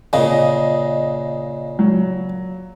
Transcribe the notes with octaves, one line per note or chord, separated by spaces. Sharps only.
A#2 C#3 D#5
F#3